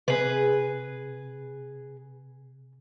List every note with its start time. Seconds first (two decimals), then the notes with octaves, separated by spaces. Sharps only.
0.08 C3 G#4 B4